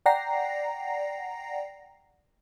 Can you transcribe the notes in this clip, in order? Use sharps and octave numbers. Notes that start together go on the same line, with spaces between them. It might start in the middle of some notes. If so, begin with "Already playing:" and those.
D5 F#5 G5 A#5 A#6 C7